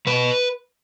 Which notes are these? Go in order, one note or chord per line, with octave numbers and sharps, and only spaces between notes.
B2 B4